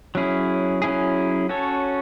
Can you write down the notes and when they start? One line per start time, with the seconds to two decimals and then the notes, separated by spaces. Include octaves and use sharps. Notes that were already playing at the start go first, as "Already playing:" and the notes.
0.15 F#3 C#4 E4 G#4
0.82 F#3 C#4 E4 G#4
1.49 C#4 F#4 A4 C#5